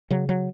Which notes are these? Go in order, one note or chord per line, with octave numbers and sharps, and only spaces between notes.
C#3 F#3
F#3